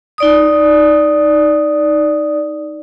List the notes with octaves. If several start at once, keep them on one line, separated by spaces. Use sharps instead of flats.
D#4 D5 D#6